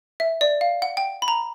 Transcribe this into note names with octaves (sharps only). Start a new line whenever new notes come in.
E5
D5
F5
F#5
G5
B5
A#5